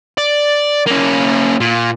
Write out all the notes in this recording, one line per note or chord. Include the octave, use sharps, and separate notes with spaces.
D5
A#3 C#4
A#2